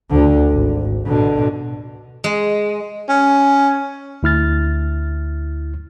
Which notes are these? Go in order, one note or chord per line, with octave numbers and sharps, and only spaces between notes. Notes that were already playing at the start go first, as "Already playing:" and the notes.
D2 D3
G#1
B2 D3
G#3
C#4
D2 E4 F6 A6